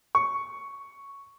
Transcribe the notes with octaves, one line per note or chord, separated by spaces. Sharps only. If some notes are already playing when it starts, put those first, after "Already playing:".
C#6